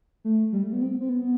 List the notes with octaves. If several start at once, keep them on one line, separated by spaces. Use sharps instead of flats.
A3
G3
A3
B3
C4
C4
B3